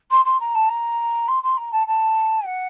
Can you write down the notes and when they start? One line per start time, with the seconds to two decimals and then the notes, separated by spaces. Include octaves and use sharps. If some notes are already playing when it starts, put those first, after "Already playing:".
0.11 C6
0.25 C6
0.40 A#5
0.55 A5
0.69 A#5
1.28 C6
1.43 C6
1.57 A#5
1.72 A5
1.87 A5
2.46 F#5